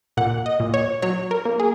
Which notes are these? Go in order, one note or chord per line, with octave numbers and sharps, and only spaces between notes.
A#2 F#5
D#5
A#2
C#5
F#3 C#5
A#4
A#3
G#4